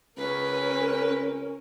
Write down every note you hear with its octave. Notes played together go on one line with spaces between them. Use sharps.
C#2 C#4 A#4 B4